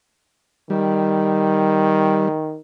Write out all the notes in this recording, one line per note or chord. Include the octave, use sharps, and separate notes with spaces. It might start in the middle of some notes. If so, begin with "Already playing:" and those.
D#3 G3